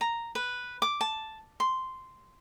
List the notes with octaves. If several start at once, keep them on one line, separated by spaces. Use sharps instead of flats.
A#5
B4
D6
A5
C6